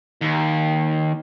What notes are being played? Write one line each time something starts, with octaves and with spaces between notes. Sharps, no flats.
D#2